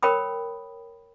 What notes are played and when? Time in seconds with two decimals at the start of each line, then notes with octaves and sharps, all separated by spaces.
0.03 A#4 C#5 G5 B5 D#6